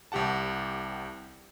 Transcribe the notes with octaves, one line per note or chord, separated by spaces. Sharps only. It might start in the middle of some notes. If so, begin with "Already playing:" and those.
C2 C3 G4 F#5 A5